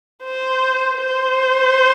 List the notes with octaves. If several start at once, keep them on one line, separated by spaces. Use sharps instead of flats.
C5
C5